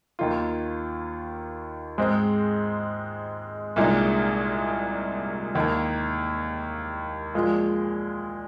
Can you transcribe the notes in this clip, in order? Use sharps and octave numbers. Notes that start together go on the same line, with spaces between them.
D#2 D#3 A#3 F4
G#2 G#3 C4
C2 A#2 G#3 D#4
D#2 D#3 A#3
A#2 F3 G#3 F4